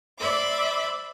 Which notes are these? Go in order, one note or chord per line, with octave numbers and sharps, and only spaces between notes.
C5 D5 E5 B5 D6